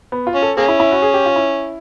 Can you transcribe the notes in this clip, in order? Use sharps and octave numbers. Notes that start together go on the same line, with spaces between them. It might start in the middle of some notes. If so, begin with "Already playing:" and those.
B3
F4
C#4
A4
A#3 C#4 G#4
E4
E4
F#4
G#4
G4
F4
E4